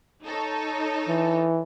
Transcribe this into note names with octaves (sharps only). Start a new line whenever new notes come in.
D#4 A4 C#5
E3